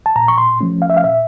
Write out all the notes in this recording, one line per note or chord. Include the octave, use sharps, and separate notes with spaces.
A5
A#2 A#5
C#6
C6
F3 A3 C#4
F5
E5
F5
A#2 E5